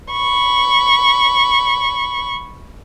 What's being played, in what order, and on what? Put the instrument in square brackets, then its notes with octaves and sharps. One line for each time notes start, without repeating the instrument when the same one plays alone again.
[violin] B5 C#6